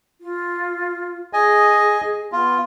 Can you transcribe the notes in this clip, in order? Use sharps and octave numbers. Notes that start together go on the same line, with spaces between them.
F4
G#4 D#5 G#5
B3 F4